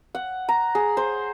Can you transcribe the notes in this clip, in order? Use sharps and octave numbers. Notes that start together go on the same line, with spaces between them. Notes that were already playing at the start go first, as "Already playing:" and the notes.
F#5
A#5
G#4
C5